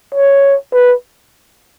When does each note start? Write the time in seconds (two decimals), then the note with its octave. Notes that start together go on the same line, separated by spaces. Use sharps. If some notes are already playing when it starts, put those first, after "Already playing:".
0.15 C#5
0.73 B4